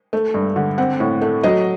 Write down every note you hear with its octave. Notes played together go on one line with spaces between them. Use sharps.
A3
G2
D3
C4 F#5
A2
A3
F#3 D#5